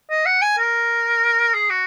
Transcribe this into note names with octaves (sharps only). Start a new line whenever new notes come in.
D#5
F#5
G#5
A#4
G#4
F#4